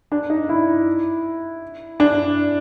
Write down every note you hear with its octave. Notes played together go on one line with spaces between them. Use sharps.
D4
D#4
E4
D4